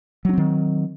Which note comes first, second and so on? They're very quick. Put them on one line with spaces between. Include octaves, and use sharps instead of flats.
F#3 D4 C4 D#3